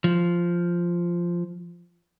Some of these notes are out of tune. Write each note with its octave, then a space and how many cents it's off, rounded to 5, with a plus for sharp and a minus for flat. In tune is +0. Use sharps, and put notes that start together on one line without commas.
F3 -5